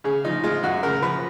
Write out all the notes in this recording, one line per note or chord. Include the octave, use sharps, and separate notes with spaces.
C#3 G#4
F3 D#4
G#3 F4
F#2 F#4
C#3 A#4
F3 B4